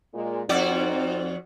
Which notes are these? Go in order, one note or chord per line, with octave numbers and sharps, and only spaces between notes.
A#2 G#3
F2 C4 D#4 F#4 D5